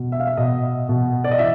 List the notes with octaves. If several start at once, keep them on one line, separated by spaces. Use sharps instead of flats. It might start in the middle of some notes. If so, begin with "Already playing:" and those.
Already playing: B2
E5
F5
E5
B2 D#5
B2
D5
D#5
E3 E5